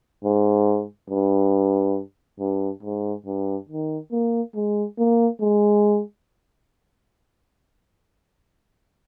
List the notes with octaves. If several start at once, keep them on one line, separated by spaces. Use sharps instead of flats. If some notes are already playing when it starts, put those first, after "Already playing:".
G#2
G2
G2
G#2
G2
D#3
A#3
G#3
A#3
G#3